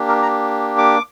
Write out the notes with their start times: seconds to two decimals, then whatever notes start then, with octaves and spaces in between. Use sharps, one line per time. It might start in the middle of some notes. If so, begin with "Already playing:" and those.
Already playing: A#3 D4 G4
0.08 A#4
0.23 A#5
0.78 D6